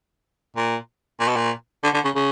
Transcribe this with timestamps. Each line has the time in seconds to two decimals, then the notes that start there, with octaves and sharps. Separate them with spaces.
0.57 A#2
1.20 A#2
1.28 B2
1.36 A#2
1.84 D3
1.94 D3
2.05 C#3
2.15 C#3